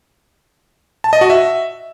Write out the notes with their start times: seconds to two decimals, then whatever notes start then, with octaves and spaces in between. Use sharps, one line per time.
1.04 A5
1.13 D#5
1.21 F#4
1.30 E5